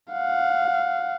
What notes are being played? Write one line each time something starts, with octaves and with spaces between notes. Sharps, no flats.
F5 F#5